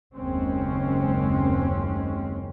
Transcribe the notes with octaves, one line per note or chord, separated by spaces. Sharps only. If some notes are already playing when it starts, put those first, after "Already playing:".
F#1 D#2 G#3 C4 C#4